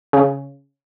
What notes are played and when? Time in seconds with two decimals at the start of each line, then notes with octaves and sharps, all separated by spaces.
0.13 C#3